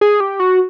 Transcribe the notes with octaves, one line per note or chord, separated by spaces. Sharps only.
G#4
G4
F#4